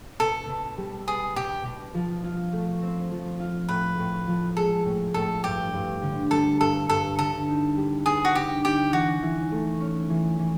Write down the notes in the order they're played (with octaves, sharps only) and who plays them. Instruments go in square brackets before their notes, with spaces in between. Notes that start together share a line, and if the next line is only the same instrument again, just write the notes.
[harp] B2 [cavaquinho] A4
[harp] B2
G3
[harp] B3 [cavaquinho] G#4
[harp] B2 [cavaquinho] G4
[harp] B2
F3
F4
A3
C4
F3
F4
[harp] A2 [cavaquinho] B4
[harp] A2
F3
[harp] G#3 [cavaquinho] A4
[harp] A2
[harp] A2 [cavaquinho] A4
[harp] G2 [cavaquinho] G4
[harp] G2
D3
[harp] G3 [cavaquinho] A4
[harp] G2 [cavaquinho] A4
[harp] G2 [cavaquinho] A4
[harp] D3 [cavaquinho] A4
[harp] D#4
G3
[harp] B3 [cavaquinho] G#4
[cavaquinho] F#4
[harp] D3 [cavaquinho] G4
[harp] D#4 [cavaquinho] G4
[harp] E3 [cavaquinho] F#4
[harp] E3
A3
C#4
E3
E3